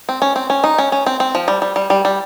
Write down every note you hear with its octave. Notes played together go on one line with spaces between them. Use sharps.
C4
C#4
C4
C#4
D#4
C#4
C#4
C4
C4
F3
G3
G3
G3
G3
G3